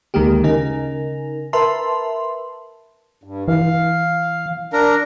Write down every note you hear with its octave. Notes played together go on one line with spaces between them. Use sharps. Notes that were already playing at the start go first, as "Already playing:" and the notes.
D2 D#3 G#3 A#3 G4
C#3 D#4 A#4
A#4 B4 E5 A5 C6
G2
E3 F5
D4 A#4